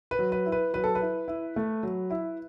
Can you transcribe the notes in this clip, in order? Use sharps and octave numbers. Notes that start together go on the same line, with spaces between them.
B4
F#3
B4
E4
B4
F#3 B4
A4
B4
E4
E4
A3
F#3
E4